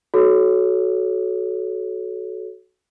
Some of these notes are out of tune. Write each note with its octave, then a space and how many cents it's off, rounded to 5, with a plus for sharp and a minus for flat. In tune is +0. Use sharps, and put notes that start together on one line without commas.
F#4 +0 A4 -35 C#5 +0